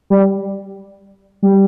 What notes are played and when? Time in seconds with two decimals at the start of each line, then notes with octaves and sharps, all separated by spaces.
0.10 G3
1.43 G3